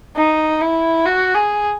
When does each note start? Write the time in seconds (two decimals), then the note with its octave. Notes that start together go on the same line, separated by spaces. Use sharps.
0.16 D#4
0.61 E4
1.05 F#4
1.35 G#4